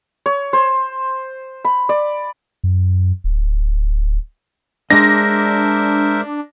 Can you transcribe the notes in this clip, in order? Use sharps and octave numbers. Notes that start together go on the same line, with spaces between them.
C#5
C5
B5
D5
F#2
D1
G#3 D4 A#4 C5 D#5 E5 A#6